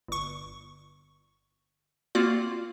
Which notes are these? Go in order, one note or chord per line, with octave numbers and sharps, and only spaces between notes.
G1 C#6
A#3 C4 F4 F#4 D5